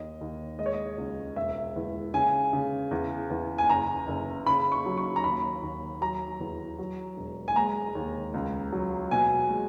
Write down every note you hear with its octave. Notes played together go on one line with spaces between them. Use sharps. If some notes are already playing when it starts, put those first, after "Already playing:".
Already playing: D#2 D#5
D#2
G#3 D#5
C#5
D#5
C#2
E1 E5
E2
C#3 G#5
C#3
E2
E2
G#5
F#1 A#5
F#1
C#3 B5
C#6
F#3
C#6
A#5
D#2 B5
D#2
F#3 A#5
E2
F#3
E1
G#5
G#3 A#5
D#2
C#2
F#3
B2 G#5
G#3